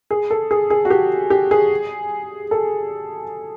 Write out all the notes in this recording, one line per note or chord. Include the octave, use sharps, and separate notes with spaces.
G#4
A4
G#4
G#4
F#4
G4
G4
G#4
A4